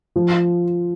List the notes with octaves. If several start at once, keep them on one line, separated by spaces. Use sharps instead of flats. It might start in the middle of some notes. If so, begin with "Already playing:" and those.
F3